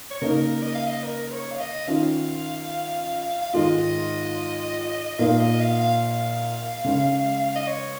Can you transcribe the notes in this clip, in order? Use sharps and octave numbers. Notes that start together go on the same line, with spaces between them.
C#5
C#3 A#3 D#4 A#4
D#5
F5
D#5
A#4
A#4
C#5
F5
D#5
D#3 C#4 F4 F5
F5
G#2 D#3 G#3 F4 D#5
A#2 A#3 D#4 F5
D#5
F5
F5
C#3 G#3 C#4
D#5
C#5